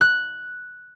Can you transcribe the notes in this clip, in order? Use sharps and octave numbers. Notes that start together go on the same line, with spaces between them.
F#6